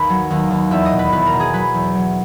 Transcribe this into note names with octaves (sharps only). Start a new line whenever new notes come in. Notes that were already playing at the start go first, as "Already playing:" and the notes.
Already playing: D#2 B4
F#3
D#2
D#2
E2 E5
D#5
B2
B4
E2 B4
A#4
B2
G#4
F#3 B4
E2
F#3